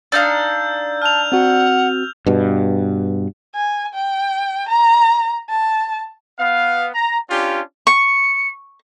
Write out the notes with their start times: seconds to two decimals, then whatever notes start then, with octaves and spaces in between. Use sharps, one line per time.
0.12 D4 D#4 F5 E6 G6
1.02 A5 F6 F7
1.32 C4 F#4 F#5
2.27 G2 B2
3.55 G#5
3.94 G5
4.69 A#5
5.49 A5
6.39 B3 F5
6.94 A#5
7.30 C#4 D4 F4 G4
7.87 C#6 C#7